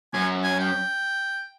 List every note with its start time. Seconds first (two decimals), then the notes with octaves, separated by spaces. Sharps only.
0.14 F#2 G#5
0.44 G#5
0.60 G5